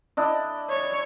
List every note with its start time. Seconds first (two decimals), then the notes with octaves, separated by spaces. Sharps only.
0.17 D4 E4 D#5
0.70 C#5